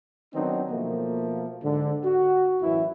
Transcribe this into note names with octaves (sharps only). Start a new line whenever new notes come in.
D#3 F#3 B3 C4 D4 D#4
B2 F3 A3 A#3
G#2 D3
F#4
A1 F#2 E3 E4